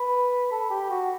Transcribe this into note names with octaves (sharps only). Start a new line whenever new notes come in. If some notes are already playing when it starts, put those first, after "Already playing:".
Already playing: B4
A4
G4
F#4